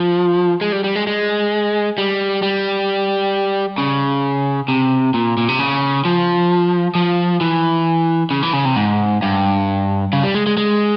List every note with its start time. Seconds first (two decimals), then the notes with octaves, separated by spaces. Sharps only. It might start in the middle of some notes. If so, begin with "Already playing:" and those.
Already playing: F3
0.61 G#3
0.72 G3
0.84 G3
0.95 G#3
1.07 G#3
1.98 G3
2.42 G3
3.78 C#3
4.68 C3
5.14 A#2
5.38 A#2
5.49 C3
5.59 C#3
6.05 F3
6.95 F3
7.41 E3
8.31 C#3
8.43 E3
8.53 C#3
8.65 C3
8.76 G#2
9.22 G2
10.13 C#3
10.23 G3
10.35 G#3
10.47 G#3
10.57 G#3